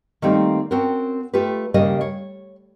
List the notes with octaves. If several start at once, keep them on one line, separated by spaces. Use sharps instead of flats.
D#3 G3 A3 A#3 C4
C4 C#4 F#4 A#4
A3 F4 G4 B4
D#2 C#3 G3 A#3 C#4 D#5
C#5